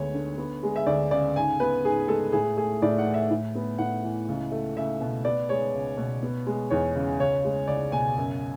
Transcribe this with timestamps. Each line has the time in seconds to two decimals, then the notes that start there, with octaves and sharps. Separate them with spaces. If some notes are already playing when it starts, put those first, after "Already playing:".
Already playing: D2 G#3 B3 C#5
0.14 D3
0.38 B3
0.63 G#3
0.76 E5
0.87 D2 D5
1.11 C#3 D5
1.36 G#2 G#5
1.60 B3 B4
1.84 G#2 G#4
2.08 G#3 A4
2.32 A2 G#4
2.57 A3 G#4
2.82 A2 D5
2.99 F#5
3.06 E3
3.14 E5
3.31 A2
3.55 B3
3.78 A2 F#5
4.04 E3
4.28 C#2
4.52 A3
4.77 C#2 E5
5.01 B2
5.25 B3 D5
5.49 G#3 C#5
5.74 C#2
5.98 B2
6.23 B3
6.47 G#3
6.70 E2 C#5
6.95 C#3
7.19 C#2 C#5
7.44 G#3
7.68 C#2 D5
7.92 B2 G#5
8.17 F#2